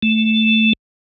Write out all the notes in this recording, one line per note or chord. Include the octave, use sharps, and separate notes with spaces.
A3